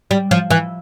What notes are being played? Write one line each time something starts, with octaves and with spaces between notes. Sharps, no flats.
G3
F3
E3